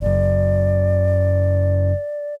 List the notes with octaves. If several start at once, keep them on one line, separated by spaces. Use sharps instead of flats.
F#1 F#2 D5